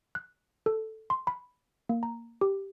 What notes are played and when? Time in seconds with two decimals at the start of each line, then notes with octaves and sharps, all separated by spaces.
0.15 F#6
0.66 A4
1.10 C6
1.27 B5
1.89 A#3
2.03 A#5
2.41 G4